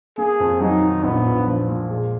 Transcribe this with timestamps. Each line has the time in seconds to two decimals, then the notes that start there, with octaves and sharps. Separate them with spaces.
0.18 A#3 G#4
0.40 F2
0.60 F#3 D#4
0.83 D#3
1.04 A#1 B3
1.26 A#1
1.47 F3
1.68 A#2
1.90 G#3